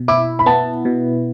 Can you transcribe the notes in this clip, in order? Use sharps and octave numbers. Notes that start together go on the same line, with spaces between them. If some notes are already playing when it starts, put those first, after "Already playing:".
Already playing: B2
E4 D6
B5
B3 A5
B2